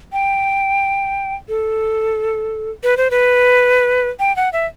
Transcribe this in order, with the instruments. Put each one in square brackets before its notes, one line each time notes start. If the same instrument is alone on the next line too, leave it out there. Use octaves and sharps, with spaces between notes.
[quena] G5
A4
B4
C5
B4
G5
F#5
E5